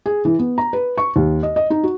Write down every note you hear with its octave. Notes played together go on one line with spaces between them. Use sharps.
G#4
E3
B3
A#5
B4
C#6
D#2
D#5
D#5
D#4
F#4